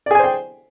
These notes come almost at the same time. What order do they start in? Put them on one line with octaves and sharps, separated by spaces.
D5 G#4 G#5 C5 G5